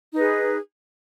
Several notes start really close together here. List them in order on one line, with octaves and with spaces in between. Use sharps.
D#4 B4 G#4